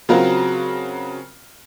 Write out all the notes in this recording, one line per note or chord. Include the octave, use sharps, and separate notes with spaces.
C#3 F#3 C4 F4 F#4 A#4